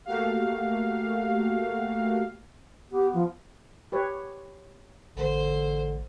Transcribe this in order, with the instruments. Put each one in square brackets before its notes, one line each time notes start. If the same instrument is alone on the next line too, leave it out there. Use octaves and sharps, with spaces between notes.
[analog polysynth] A3 A#3 F#4 G4 F5
[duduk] B3 [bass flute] G4
[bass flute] F3
[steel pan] G4 B4 C#5
[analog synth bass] A1 [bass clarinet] D3 [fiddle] C5